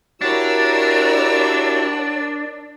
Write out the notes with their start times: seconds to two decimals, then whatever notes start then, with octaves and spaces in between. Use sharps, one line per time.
0.21 D4 E4 F#4 G4 A#4 C#5 E6